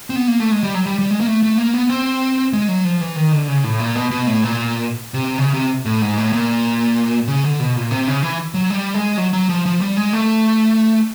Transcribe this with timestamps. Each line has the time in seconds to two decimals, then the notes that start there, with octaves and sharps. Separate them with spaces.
0.10 C4
0.16 B3
0.28 A#3
0.40 A3
0.51 G#3
0.63 G3
0.74 F#3
0.86 G3
0.99 G3
1.11 G#3
1.21 A#3
1.27 A3
1.43 A3
1.58 A#3
1.74 B3
1.89 C4
2.53 G#3
2.68 F#3
2.85 F3
3.01 E3
3.16 D#3
3.32 D3
3.48 C#3
3.64 A2
3.80 A#2
3.95 B2
4.11 B2
4.27 A2
4.43 A#2
5.14 C3
5.38 C#3
5.54 C3
5.85 A2
6.02 G#2
6.18 A2
6.33 A#2
7.28 C#3
7.44 D3
7.60 B2
7.76 A#2
7.91 C3
8.08 C#3
8.23 E3
8.54 F#3
8.70 G3
8.94 G#3
9.17 F#3
9.33 F#3
9.49 F3
9.66 F3
9.81 G3
9.97 G#3
10.13 A3